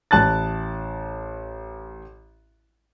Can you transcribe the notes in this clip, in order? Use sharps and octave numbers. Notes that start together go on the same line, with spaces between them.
A1 A5 F#6 A6